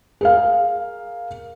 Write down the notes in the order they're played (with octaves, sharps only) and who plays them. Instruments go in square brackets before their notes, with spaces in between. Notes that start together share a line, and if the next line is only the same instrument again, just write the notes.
[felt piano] G#4 A#4 F5